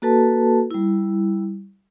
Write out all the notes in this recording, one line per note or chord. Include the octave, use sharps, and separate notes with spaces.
A#3 F#4 A4 B4 A5
G3 E4